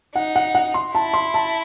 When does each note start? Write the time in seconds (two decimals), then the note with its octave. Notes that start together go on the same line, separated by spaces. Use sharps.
0.15 D#4 F#5
0.36 F#5
0.55 F#5
0.74 C6
0.95 E4 A5
1.14 C6
1.34 A5